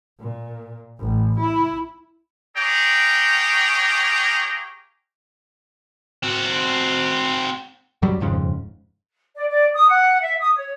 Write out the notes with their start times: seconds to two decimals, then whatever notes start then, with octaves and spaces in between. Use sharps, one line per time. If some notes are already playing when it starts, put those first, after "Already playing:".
0.20 A#2
0.99 A1
1.40 E4
2.56 G4 G#4 C#5 F5 G5 A#5
6.23 C4 F#4
8.02 F#2 F#3 G3
8.20 D#1 F2 G#2 C#3
9.35 D5
9.48 D5
9.73 D#6
9.88 F#5
10.20 E5
10.39 D#6
10.54 C#5